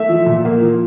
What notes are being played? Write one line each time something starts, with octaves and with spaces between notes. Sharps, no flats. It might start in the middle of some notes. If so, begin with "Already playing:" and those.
Already playing: A3 E5
F3
A#2
A#3
F3